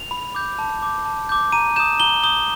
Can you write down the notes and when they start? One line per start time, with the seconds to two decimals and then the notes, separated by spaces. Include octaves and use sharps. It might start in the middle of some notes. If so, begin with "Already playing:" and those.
Already playing: F7
0.11 B5
0.35 D6 G6
0.59 A5
0.82 D6 G6
1.05 A5
1.29 D6 G6
1.52 A#5 D#7
1.76 D#6 G6 E7
2.00 A#5 G7
2.23 D#6 G6 G7